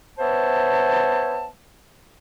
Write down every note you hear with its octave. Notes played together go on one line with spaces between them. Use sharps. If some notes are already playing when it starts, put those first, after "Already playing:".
B3 C5 C#5 E5 A5